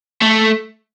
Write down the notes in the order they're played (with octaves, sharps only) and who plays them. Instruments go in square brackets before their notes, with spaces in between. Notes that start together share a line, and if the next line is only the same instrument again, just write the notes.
[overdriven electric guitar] A3